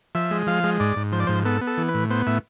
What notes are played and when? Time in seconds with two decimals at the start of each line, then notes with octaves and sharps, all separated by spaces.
0.15 F3 E5
0.31 G#3
0.47 F3 F5
0.64 G#3
0.80 G#2 D5
0.96 G#2
1.12 F3 C5
1.20 D5
1.27 G#2 C5
1.45 B3 A4
1.61 B3
1.67 A4
1.77 E3
1.89 B4
1.94 A2
2.10 B3 C5
2.27 A2 E5